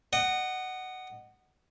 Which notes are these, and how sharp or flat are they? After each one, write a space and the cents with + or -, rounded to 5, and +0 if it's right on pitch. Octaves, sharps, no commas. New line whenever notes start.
D#5 -25 F#5 +10